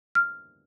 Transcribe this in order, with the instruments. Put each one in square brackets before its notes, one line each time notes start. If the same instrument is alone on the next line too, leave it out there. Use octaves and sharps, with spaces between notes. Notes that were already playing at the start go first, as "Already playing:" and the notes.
[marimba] F6